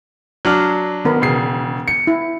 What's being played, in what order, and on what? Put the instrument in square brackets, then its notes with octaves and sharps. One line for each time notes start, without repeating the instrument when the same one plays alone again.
[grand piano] F#3 D4 F6
[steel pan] D#3 B3 A#4
[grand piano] E1 C#3 C7
C#7
[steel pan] E4